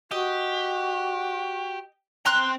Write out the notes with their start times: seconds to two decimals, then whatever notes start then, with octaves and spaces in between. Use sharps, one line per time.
0.11 F#4 G4 D#5
2.26 C4 G5 A#5 C6 F#6